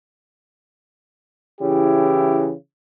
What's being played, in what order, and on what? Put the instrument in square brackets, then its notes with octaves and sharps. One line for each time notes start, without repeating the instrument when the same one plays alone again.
[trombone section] C#3 E3 E4 G4